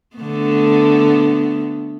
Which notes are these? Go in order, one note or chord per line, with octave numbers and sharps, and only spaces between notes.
D3 A3 B3